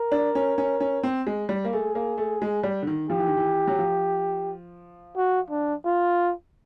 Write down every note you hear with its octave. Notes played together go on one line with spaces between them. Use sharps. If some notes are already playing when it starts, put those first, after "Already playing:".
Already playing: A#4
D4
C#4
C#4
C#4
C4
G#3
G3
A#3
A3 G#4
A#3
A3
G#3
G3
D3
D#3
F3 G4
E3
D#3
E3
F#3
F3
F#4
D4
F4